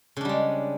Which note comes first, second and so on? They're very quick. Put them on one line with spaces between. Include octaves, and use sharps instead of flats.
C#3 D4 G3 G#3